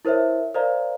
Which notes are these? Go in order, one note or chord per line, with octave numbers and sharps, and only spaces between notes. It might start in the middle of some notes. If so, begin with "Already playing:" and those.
E4 A#4 C5 C#5 E5
A#4 C5 D5 D#5 F5 A#5